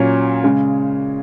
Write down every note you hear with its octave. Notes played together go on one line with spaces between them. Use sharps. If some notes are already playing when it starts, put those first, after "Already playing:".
Already playing: A#2 F#3 C#4
C#3 G#3